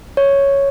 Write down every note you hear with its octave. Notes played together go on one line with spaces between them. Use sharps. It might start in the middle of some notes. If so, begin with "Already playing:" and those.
C#5